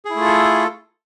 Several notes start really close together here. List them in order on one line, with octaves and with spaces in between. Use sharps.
G#4 E4 A3 F4 A4